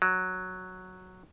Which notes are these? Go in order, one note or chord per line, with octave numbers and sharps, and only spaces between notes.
F#3